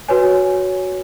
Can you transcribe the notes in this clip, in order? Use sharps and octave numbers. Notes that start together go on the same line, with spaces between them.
F#4 B4 C#5 G#5